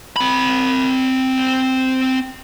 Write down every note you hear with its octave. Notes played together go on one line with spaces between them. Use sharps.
C4 B5